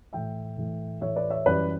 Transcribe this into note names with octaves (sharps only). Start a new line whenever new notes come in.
A2 E3 A3 E5 G5
A2 E3 A3
A2 E3 A3 C#5 E5
B4 D5
C#5 E5
F#2 E3 G3 B4 D5